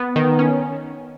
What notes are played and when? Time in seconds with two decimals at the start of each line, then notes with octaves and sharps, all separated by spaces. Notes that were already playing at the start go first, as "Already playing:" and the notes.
Already playing: B3
0.16 D#3
0.39 C#4